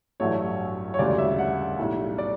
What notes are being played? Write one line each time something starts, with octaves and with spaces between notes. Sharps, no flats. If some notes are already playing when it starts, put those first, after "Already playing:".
A1 G2 F#3 A3 C#5
C#5
E1 D2 C#3 G3 D5
E5
F#5
B1 A2 G3
D5